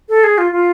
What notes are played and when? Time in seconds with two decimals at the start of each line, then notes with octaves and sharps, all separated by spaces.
0.09 A4
0.24 G#4
0.38 F4
0.52 F4